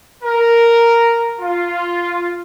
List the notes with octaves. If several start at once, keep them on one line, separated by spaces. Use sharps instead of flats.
A#4
F4